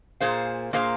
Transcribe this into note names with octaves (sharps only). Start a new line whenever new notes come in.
A#2 A#3 G#4 C5 F5
A#2 A#3 G#4 C5 F5